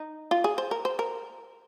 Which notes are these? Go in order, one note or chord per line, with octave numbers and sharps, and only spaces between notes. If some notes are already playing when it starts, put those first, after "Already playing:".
Already playing: D#4
F4
G#4
C5
A#4
C5
A#4